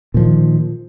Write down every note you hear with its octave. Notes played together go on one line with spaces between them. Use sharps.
A#2 D#3 F3